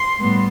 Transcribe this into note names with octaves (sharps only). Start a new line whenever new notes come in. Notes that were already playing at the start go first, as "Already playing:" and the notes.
Already playing: C6
A2 G3 B3